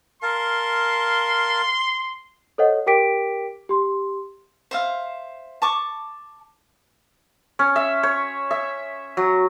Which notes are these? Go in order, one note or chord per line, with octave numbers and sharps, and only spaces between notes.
A#4 F5 A5 C6
A4 C5 C#5 D#5 F#5
G4 A#4 G5 D6 B6 D7
G4 C6
C5 E5 F5
A5 C#6 D6
C#4
E5
C#5
E5
F#3